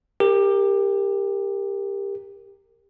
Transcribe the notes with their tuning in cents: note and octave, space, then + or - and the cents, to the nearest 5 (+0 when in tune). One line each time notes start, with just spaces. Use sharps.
G4 +20 A#4 -15